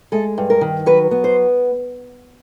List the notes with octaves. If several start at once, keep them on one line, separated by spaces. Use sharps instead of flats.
G#3 A4
G2
A#4
D#3
F#3 B4
B3
C5